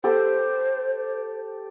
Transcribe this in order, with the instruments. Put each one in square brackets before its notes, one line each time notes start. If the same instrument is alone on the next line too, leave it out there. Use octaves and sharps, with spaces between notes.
[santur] G4 A4 [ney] C5